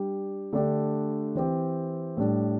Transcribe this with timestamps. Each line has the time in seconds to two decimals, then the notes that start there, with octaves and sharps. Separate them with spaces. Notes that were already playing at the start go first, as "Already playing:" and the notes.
Already playing: G3 D4 G4
0.53 D3 A3 D4 G4
1.35 E3 C4 G4
2.17 A2 G3 D4